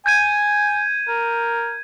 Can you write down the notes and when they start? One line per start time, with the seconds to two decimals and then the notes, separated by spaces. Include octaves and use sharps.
0.06 G#5 G6 G#6 D#7
1.09 A#4